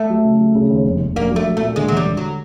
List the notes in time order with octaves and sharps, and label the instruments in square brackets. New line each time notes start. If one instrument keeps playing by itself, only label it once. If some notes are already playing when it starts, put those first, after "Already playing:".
Already playing: [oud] A3
[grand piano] F#3
C#3
F#3
C#3
D#2
F1
F1
[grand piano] A#1 [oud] A#3
[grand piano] F#3
[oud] A3
[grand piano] F#3
[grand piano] A#2 [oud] A3
[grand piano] D3 [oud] G#3
[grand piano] E1 [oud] F#3
[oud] G3
[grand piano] D3
[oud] F#3